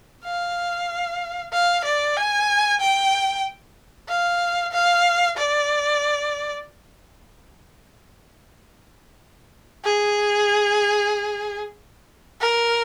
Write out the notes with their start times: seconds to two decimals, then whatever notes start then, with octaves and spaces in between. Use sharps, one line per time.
0.25 F5
1.53 F5
1.85 D5
2.17 G#5
2.81 G5
4.09 F5
4.72 F5
5.37 D5
9.85 G#4
12.40 A#4